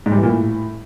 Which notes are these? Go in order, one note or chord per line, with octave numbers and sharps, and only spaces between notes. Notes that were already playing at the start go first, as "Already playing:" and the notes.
G#2
G3
E3
A#2
A2